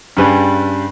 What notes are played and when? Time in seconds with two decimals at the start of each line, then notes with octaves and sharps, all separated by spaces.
0.17 G2 C#3 G3 B4 G#5